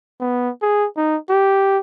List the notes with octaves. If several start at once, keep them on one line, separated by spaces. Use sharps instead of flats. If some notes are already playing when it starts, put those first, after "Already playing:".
B3
G#4
D#4
G4